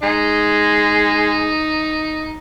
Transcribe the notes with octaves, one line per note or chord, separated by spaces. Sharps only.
G#3 D#4